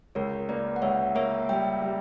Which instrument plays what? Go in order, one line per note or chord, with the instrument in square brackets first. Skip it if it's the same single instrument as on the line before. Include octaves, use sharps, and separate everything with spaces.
[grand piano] C#2 [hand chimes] A#4 C#5
[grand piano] A#3 [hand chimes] B4 D5
[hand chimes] F#5
[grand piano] C#2 [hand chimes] C#5 E5
[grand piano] A#3 [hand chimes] C#5 E5
[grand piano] G3 [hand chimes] E5 G5
[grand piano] G3